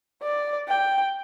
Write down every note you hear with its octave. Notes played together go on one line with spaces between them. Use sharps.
D5
G5